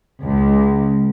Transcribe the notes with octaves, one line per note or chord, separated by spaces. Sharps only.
C#2